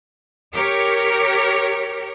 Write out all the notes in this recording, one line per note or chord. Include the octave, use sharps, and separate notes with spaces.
G4 A#4 C#5